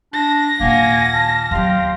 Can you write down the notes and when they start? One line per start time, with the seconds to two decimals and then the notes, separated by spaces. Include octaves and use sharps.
0.13 D4 A#6
0.60 D#2 A#2 A#3 F#5 G#5 G#6
1.11 A5 F6
1.51 D#2 F#3 G4 F5 C6